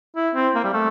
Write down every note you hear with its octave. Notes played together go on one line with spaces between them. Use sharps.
E4
C4
A#3
G3
A3